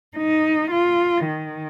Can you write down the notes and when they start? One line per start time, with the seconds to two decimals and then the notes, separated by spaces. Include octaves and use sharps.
0.17 D#4
0.71 F4
1.26 D#3